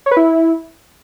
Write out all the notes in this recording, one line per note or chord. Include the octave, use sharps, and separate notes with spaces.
C#5
B4
E4